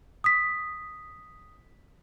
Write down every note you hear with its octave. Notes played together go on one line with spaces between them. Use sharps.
D#6 B6